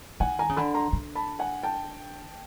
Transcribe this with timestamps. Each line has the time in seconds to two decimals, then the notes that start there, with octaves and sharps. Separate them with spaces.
0.20 D#3 F#5 G#5
0.39 G#5 A#5
0.49 C#3
0.56 D3 A5 B5
0.74 A#5 C6
0.93 D3
1.15 A5 B5
1.39 F#5 G#5
1.63 G5 A5